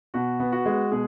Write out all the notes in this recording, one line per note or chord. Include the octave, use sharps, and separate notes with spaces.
B2 F#4
B3
F#4
G#3
B2 G#4